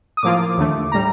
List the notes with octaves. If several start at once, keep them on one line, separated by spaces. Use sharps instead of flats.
D#6
A2 F3 A#3 F4 D6
D#2 D3 A3
A2 G3 A#5